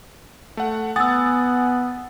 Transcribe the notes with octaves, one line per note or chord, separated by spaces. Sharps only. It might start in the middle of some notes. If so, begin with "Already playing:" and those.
A3 F#5
B3 F#5 G#5 D#6 E6 A6